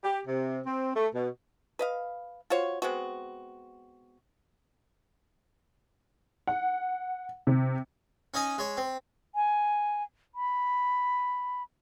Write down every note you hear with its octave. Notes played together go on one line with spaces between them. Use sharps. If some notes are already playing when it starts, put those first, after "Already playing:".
G4
C3
C4
A3
B2
B4 D#5 F5
F4 F#4 C5 C#5
G#3 B3 C4 F#4
F#5
C3
C#4 D#4 D#5 G#5
G#3 C#5
C4
G#5
B5